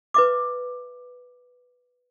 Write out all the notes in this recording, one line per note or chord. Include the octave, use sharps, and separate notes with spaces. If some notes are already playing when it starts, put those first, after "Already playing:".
B4 E5 D6